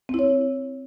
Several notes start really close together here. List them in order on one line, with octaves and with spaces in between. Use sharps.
C4 E4 C#5